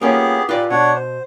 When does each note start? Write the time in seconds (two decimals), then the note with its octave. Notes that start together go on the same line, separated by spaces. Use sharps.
0.01 A#3 B3 C#4 F4 G4 G#4
0.49 F4 G4 B4 D5
0.70 B2 D4 C#5 F#5
0.95 C5